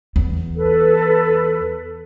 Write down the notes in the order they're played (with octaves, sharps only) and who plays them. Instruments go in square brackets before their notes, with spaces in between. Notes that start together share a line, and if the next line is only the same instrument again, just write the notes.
[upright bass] E2
[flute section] A4 B4